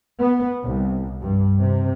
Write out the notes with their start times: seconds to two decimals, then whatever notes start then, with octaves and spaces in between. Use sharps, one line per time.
0.19 B3
0.60 C2
1.21 G2
1.59 C3